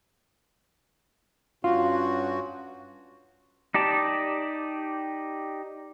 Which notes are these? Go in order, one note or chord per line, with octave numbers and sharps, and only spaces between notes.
G2 C#4 F4 F#4
D#4 G4 D5 A5